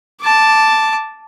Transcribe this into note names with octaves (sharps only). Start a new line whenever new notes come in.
A5 D6